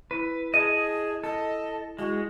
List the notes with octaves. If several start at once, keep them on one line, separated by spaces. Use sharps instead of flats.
E4 B4
G#4 D#5 A5
A4 D#5
G#3 E4 F#4